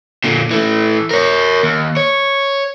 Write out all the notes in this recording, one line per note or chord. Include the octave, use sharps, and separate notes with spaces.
A#2 D3
E3 A3
A#4 C#5
D#2
C#5